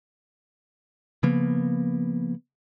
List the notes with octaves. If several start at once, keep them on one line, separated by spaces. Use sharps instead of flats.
C#3 F3 A#3 B3